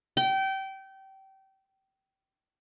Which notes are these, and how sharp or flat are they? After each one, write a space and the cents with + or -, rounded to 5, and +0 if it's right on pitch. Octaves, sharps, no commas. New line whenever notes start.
G5 -25